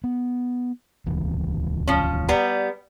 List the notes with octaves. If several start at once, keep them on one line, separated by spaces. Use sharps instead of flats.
B3
D#1 C#2 E3
F3 C#4
G3 B3 A#5